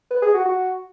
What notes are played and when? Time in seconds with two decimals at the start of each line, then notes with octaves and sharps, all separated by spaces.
0.11 B4
0.22 G#4
0.34 F#4
0.45 F#4